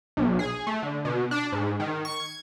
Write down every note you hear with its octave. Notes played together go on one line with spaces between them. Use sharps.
B1
G#4
A3
D3
B2
D4
G#2
D#3
C#6
G#6